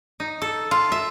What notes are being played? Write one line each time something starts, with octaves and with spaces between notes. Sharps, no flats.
D#4
A4
F4
E5